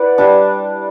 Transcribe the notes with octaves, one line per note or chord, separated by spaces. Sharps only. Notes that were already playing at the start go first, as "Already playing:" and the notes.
Already playing: E4 B4 D5 F#5
G3 D4